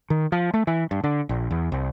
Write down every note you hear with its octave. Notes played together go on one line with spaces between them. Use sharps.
D#3
F3
A3
E3
G2
D3
A#1
E2
C2